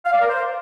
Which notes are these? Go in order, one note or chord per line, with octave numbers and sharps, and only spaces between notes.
F5
D5
A#4
C5